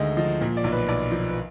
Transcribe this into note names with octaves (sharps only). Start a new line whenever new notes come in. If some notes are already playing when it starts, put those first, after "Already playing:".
Already playing: D2 D3 D#3 G#3 D#5
F3 D#5
A#2
D5
B1
B4
B1 D5
F3
B4